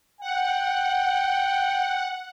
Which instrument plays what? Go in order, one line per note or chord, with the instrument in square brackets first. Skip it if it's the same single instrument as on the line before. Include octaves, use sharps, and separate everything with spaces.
[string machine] F#5 [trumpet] G5